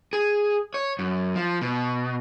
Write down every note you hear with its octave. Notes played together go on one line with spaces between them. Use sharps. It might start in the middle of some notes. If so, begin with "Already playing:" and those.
G#4
C#5
F#2
F3
B2